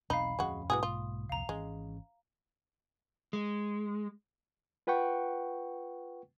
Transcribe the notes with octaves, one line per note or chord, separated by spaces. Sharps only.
E1 B1 C4 D#4 F5 B5
D1 F2 G#3 C#4 F#4
B1 G#2 E3 A#3 F#4 G#4 D#6
F4
C2 F2 A#2 F5 A#5
G#1 E3 G#3 C#4
G#3
F4 B4 F#5 G5 C#6